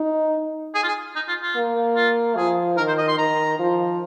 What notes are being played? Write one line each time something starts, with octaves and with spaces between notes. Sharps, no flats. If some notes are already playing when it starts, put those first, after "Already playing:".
Already playing: D#4
G#4
F4
G#4
D#4
F4
F4
A#3
F4
F3 G#4
D#3 A#4
C5
D#5
C6
D#3 A#5
F3